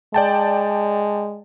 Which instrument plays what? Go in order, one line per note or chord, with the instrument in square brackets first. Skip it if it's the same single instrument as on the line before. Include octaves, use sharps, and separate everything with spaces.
[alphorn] G#3 [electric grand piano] D5 G5 A5